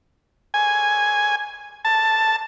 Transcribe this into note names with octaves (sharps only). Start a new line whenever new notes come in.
G#5
A5